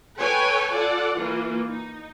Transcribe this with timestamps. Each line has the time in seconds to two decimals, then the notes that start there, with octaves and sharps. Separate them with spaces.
0.18 A4 B4 C#5 G5 G#5
0.72 F4 A4 D5 F#5
1.15 E3 A#3 F4
1.67 D#4